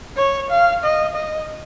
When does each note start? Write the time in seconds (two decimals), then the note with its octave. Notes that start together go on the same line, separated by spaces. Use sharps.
0.17 C#5
0.50 F5
0.83 D#5
1.15 D#5